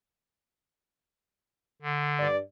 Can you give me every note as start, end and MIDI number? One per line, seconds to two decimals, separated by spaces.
1.82 2.27 50
2.19 2.39 43
2.19 2.39 74